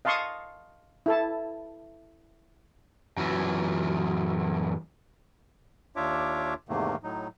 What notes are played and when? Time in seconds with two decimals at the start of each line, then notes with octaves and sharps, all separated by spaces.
0.05 D#5 F5 A5 C6 C#6 D#6
1.06 E4 A4 A5
3.17 F#2 E3
5.96 D#2 D4 F4 C#5 E5 D6
6.69 E2 G#2 C3 D#3 A3 A#3
7.03 A2 F#3 D#4